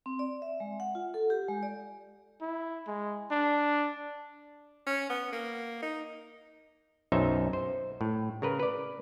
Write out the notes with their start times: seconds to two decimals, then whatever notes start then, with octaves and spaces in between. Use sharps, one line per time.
0.06 C4
0.19 D5
0.42 E5
0.60 G#3
0.80 F#5
0.95 F4
1.14 A4
1.30 G4
1.48 G#3
1.63 D5
2.41 E4
2.87 G#3
3.31 D4
4.87 C#4
5.10 B3
5.32 A#3
5.83 D#4
7.12 B1 F#2 D#4 C5 C#5 E5
7.53 C5
8.01 A2
8.42 C#3 A#4 B4
8.59 B4 D5